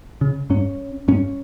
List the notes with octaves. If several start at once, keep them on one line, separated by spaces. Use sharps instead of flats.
C#3
G2 C#4
G2 C#4